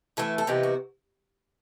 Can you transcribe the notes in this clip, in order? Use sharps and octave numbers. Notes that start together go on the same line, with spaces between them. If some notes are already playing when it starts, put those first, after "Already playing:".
A2 E3 A3 A4
A4
C3 E3 B3 D#4 G4
F#4